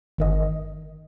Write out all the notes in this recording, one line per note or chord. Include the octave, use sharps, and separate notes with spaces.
G1 D#3 D#5